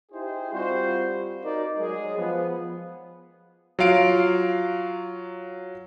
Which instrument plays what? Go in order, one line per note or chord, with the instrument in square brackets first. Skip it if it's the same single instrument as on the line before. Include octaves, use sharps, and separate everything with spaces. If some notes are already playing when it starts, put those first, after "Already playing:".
[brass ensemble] D#4 E4 G4 G#4 C5
G3 C4 F4 F#4 C5
D#4 F#4 A#4 D5
F#3 G#3 G#4
F3 B3
[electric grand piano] F#3 F4 F5 D7